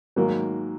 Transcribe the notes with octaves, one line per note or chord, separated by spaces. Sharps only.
G#2 D#3 F#3 A#3